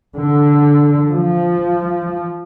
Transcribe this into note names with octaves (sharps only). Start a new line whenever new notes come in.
D3
F3